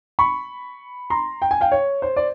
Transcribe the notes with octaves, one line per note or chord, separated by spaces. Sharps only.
B5 C#6
A#5 C6
G5
G#5
F5 G5
C#5
C5
D5